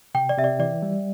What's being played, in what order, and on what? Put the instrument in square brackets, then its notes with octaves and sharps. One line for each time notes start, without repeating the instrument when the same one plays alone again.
[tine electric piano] C3 [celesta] G5
[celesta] D5
[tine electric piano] C3 [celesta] E5
[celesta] D5
[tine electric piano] E3 [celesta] D5
[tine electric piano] G3